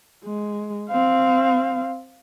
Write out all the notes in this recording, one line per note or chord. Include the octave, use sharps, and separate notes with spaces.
G#3
C4 F5